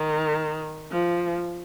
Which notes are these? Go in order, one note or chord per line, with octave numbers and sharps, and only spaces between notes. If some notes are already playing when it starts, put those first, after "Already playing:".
Already playing: D#3
F3